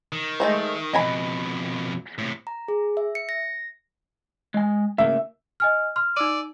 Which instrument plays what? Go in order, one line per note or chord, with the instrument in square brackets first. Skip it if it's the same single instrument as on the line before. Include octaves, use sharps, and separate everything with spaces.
[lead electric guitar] D#3
[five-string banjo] G#3 A3 C5
[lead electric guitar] F2 B2 [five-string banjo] D#5 G#5 B5
[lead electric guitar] A2 C3
[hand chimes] A#5
G#4
E5
C#7
A#6
[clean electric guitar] G#3 G#5
[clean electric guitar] A2 C#3 A#3 [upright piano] E5
[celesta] D#5 G#5 F6
C6 F6
[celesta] D#4 E6 D#7 [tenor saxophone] D5